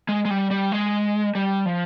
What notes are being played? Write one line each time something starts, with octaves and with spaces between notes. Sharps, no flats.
G#3
G#3
G3
G3
G#3
G3
F3